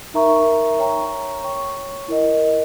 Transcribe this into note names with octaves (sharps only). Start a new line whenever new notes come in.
D#4 A#4 E5 A#5 C#6
C#5 G5 A#5 C#6
C#5 G5 C#6
E4 A#4 D#5